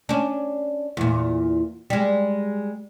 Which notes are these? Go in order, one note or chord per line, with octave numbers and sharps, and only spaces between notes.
C#4 D4
E2 A#2
G3 G#3